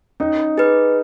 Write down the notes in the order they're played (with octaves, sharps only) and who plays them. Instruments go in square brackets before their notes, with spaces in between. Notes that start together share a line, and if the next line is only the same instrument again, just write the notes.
[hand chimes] C#4 [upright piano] D#4
[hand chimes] G#4 B4